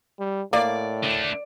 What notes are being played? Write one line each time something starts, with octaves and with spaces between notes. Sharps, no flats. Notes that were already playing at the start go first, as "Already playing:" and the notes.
G3
A2 A#3 D5
D3 A3